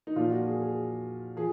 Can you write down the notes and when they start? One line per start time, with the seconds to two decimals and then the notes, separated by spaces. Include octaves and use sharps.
0.07 D#4
0.16 A#2 F3 F4
0.31 F#4
0.47 G#4
0.62 G#4
1.37 F3 G#4